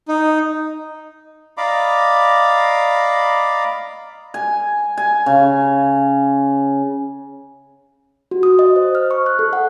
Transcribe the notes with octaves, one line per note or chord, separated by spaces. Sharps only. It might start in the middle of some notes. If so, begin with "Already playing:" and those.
D#4
D5 D#5 F5 A#5 B5 D6
G#5
G#5
C#3
F#4
D#6
D#5
C5
F6
C#6
F#6
A4
F#5